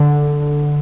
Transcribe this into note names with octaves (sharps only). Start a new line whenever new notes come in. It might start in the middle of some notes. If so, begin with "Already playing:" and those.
Already playing: D3